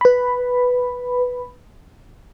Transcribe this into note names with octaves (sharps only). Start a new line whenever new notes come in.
B4 B5